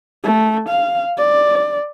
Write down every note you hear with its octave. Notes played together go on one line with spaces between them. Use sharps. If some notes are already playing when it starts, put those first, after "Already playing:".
A3
F5
D5